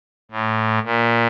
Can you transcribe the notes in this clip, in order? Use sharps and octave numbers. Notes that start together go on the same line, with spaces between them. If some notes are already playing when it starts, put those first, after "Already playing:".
A2
A#2